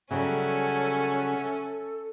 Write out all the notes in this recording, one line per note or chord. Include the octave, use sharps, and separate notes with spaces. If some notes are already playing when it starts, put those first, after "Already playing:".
C#3 F#3 G3 C#4 A4 C#5 E5 F#5